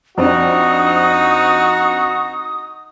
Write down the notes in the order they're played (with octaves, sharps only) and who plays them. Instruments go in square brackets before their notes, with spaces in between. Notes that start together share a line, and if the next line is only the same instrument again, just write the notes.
[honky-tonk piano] F2 C4 D4 [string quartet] D#4 [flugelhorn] F#4 [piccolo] D#6